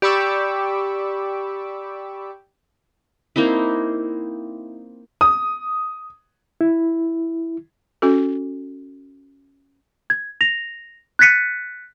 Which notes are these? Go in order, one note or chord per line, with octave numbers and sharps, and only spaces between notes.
G4 D5 B5 C#6 D6 E6
A#3 C4 D#4 E4
D#6
E4
C#4 F#4 A4
G#6
A#6 F7
F#6 G#6 A6 B6 C#7 D#7